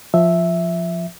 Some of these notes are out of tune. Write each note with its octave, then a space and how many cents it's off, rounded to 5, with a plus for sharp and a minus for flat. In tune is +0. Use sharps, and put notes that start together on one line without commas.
F3 +0 E5 +0